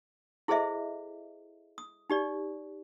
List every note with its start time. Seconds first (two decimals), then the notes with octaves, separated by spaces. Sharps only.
0.48 E4 G#4 A4 C5 D#5 E5
1.78 D#6
2.10 D#4 G4 D5